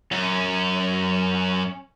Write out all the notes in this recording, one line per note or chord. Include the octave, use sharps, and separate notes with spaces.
F#2 C#4